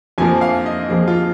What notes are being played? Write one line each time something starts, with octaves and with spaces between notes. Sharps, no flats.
F2 F3 A#3 G#5
F5
D#5
F2 F3 A#3 G#4
F4